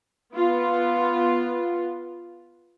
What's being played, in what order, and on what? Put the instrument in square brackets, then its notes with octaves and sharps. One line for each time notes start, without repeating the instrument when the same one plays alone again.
[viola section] B3 F4